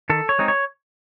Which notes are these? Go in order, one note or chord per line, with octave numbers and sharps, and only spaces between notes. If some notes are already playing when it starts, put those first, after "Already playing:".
D#3 A4
C#5
G#3 C4 D#4
C#5